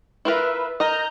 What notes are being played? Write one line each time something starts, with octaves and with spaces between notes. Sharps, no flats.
E4 F4 A#4 B4 E5
A#4 D#5 A#5 G6